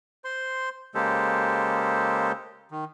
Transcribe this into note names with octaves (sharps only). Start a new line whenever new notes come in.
C5 C6
C#3 G#3 A#3 G4 A4 C5
D#3